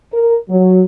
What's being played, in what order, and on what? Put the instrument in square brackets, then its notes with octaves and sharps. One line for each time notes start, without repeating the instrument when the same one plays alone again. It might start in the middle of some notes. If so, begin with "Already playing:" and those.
[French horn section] A#4
F#3